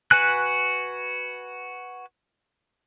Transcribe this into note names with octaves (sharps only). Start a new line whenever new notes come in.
F#4 B4 G#5 F#6